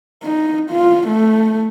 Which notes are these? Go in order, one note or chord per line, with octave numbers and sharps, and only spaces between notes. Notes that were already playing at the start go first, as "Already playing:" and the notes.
D#4
F4
A3